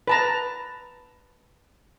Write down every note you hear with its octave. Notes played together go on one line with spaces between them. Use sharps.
B4 A5 A#5